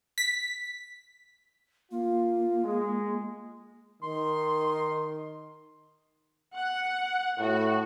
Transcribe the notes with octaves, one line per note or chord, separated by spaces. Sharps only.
B6
A#3 F4
G#3
D#3 C6
F#5
A2 F#4